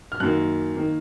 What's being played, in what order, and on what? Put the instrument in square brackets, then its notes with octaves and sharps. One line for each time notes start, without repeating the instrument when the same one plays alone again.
[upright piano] F6
F#2 D#3 A#3 F#6
D#3 A#3